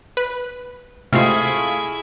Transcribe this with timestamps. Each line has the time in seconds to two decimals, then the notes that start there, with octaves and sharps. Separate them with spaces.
0.17 B4
1.13 C3 A3 E4 F4 G#4 D#5 G#5 F6